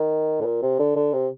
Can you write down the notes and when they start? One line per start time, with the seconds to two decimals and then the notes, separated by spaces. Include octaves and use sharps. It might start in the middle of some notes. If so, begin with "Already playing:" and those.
Already playing: D#3
0.41 A2
0.45 A#2
0.62 C3
0.80 D3
0.96 D3
1.13 C3